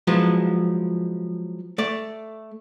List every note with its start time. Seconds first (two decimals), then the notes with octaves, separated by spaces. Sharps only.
0.07 F3 F#3 G#3 B3 E4
1.78 A3 D5